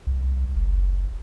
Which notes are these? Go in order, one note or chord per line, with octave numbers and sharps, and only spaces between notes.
C2
F#1